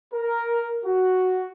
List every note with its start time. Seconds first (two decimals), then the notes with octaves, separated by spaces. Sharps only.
0.13 A#4
0.85 F#4